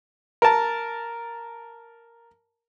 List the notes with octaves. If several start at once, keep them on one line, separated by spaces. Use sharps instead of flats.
A#4 A5